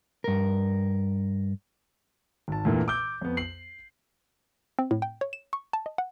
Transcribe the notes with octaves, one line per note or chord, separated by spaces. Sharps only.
G2 A#4
G#1 A5
E2 G2 A#2 E3 A3 A#3
D6 E6 G6
F2 B3
C7 F#7
C4
A2
G5
C#5
E7
C#6
A5
D#5
F#5